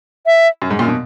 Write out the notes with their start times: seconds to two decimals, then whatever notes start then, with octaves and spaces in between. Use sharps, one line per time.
0.26 E5
0.62 F#2
0.70 G#2
0.79 F#2 A#2
0.88 B2